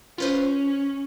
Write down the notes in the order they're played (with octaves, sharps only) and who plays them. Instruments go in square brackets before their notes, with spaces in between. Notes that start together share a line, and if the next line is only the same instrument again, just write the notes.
[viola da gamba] C#4 [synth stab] F4 B4 C5